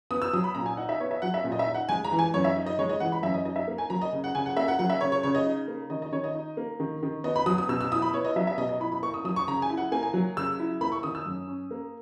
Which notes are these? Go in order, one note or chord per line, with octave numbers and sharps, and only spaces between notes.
B3 D#6
E6
F#3 D#6
B5
A#2 A#5
G#5
D#4 F#5
E5
B3 C#5
E5
F#3 F#5
E5
A#2
D#5
E5
D#4
F#5
G#3 G#5
A#5
E3
G#5
F#2 C#5
E5
D#4
D#5
G#3 C#5
D#5
E3 F#5
B5
F#2 E5
D#5
D#4 D#5
E5
A#3
G#5
F#3 A#5
D#5
C#3
F#5
C#3 G#5
F#5
A#3 E5
F#5
F#3 F#5
E5
C#3 C#5
C#5
C#3 C#5
D#5
D#4
A#3
D#3 D#5
D#5
D#3 C#5
D#5
D#4
A#3
D#3
D#3
B3 D#5
B5
F#3 D#6
D#6
B2 E6
E6
E4 D#6
B5
B3 C#5
D#5
F#3 E5
E5
B2 D#5
D#5
E4 B5
B5
A#3 C#6
D#6
F#3 D#6
C#6
C#3 A#5
G#5
E4
F#5
A#3 G#5
G#5
F#3
C#3 E6
E4
A#3 B5
C#6
D#3 D#6
E6
F#2
C#4
A#3